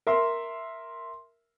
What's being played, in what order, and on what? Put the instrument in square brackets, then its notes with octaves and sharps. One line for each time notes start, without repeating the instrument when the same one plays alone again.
[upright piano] A#4 E5 C6